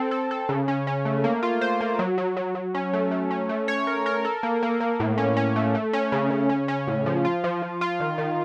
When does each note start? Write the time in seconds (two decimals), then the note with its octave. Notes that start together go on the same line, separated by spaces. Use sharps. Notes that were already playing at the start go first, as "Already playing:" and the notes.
Already playing: C4 A4
0.11 A4
0.31 A4
0.49 C#3
0.68 C#4
0.87 C#4
1.05 A3
1.24 A#3
1.43 F4
1.61 C5
1.80 A#3
1.99 F#3
2.18 F#3
2.37 F#3
2.55 F#3
2.75 C#4
2.93 A3
3.11 A3
3.31 C#4
3.49 A3
3.68 C#5
3.87 A#4
4.06 A#4
4.25 A4
4.43 A#3
4.63 A#3
4.80 A#3
5.00 A2
5.18 C#4
5.37 C#4
5.56 A3
5.75 A3
5.93 C#4
6.12 C#3
6.30 C#3
6.49 C#4
6.68 C#4
6.87 A2
7.06 F3
7.25 F4
7.44 F3
7.62 F3
7.81 F4
8.00 D#3
8.18 D#3